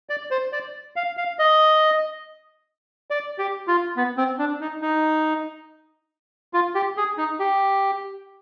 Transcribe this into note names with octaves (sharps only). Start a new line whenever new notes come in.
D5
C5
D5
F5
F5
D#5
D5
G4
F4
B3
C4
D4
D#4
D#4
F4
G4
G#4
D#4
G4